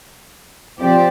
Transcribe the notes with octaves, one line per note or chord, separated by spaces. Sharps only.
F3 C4 G4 D5